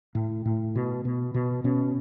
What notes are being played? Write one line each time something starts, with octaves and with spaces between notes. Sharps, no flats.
A2
A2
B2
B2
B2
B2 C#4